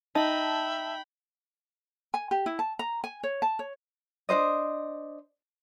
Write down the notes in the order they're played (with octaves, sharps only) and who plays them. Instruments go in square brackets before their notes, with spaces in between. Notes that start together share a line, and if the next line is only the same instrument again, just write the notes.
[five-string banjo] D#4 [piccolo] E5 [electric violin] G5 B5 [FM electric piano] A5
[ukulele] G#5
G4
E4
A5
A#5
G#5
C#5
A5
C#5
D4 D#4 C5 D#5